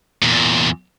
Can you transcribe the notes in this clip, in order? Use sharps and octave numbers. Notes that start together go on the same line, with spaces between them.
E2 A#2